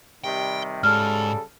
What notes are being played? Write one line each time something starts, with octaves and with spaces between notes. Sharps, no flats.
C3 D#3 G3 G5
G#2 C#3 G3 A4 F6